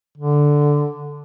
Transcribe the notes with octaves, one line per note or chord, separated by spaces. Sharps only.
D3